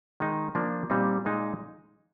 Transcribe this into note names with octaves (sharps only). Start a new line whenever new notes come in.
D#3 G#3 D#4
F3 A#3 D4
A#2 G3 C4 D#4
A#2 G#3 D#4